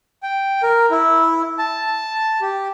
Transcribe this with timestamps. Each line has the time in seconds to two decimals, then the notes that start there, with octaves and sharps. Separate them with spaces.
0.23 G5
0.63 A#4
0.91 E4
1.59 A5
2.41 G4